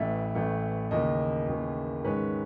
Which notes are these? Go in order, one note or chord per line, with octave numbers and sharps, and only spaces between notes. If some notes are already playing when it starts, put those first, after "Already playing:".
Already playing: A1 A2 E3 A3 E5
A1 A2 E3 A3
D#2 C#3 E3 D#5
D#2 C#3 E3
G#2 D#3 G#3 C#4 B4